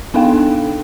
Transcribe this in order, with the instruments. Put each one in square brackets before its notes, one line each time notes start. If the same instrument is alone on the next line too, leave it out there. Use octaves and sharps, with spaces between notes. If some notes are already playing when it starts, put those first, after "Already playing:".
[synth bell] B3 D4 D#4 A4 F5 G5